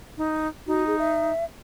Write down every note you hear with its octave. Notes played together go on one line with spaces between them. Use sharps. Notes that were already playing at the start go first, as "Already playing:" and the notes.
D#4
D#4 F#4
G#4
E5